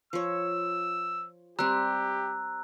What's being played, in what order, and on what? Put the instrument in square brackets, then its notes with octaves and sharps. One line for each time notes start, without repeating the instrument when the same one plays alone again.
[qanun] F3 C#5 [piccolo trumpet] E6
[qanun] G3 C4 [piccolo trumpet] G4 [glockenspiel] A#5 E6 F#6